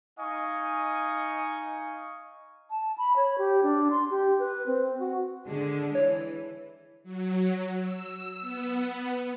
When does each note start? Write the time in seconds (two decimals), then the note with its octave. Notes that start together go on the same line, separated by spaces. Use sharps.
0.19 D#4 D#5 F5 G#5 C#6
2.70 A5
2.98 B5
3.16 C#5
3.38 G4
3.63 D4
3.91 C6
4.10 G4
4.39 B4
4.66 C4
4.99 F#4
5.48 D3 G#3 D4
5.95 E3 C#5
7.03 F#3
7.82 E6
8.41 B3